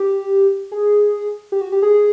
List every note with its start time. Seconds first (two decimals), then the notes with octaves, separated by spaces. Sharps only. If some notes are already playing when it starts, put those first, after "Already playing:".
Already playing: G4
0.72 G#4
1.52 G4
1.61 F#4
1.72 G4
1.82 G#4